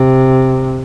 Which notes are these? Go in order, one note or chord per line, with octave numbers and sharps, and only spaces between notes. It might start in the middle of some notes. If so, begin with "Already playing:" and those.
Already playing: C3